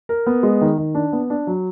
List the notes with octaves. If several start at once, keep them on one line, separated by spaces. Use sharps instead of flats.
A#4
B3
G#3
D#3
D#3
D4
B3
D4
F#3